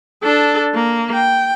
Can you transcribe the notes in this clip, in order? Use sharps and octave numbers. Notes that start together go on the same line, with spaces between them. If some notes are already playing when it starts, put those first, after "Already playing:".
D4 A4
A#3
G5